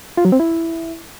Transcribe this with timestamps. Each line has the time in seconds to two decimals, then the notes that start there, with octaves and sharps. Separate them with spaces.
0.17 F4
0.25 F#3
0.32 C4
0.40 E4